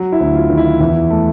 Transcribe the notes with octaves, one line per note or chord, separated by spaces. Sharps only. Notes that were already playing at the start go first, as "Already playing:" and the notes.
Already playing: F#3
E4
D2
F4
D#3
E4
E2 E4
A3